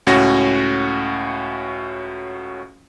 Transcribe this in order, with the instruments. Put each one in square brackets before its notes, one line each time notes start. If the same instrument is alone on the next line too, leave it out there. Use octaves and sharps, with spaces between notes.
[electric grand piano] C#2 A2 C#4 F#4 A#6